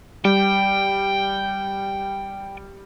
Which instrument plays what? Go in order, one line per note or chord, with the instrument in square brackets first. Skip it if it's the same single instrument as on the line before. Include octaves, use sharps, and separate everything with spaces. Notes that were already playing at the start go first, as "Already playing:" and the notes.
[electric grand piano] G3 [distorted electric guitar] G5